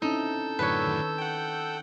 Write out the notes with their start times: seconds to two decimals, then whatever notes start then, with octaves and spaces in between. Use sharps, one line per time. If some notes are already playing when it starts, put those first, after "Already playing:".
0.02 C4 C#4 D#4 E4 A4 E6 G6
0.59 F#2 A2 D3 B4 C#5
0.86 D#3
1.18 F#5 G5